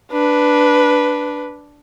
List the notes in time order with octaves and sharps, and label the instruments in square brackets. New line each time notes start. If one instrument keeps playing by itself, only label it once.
[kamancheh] D4 B4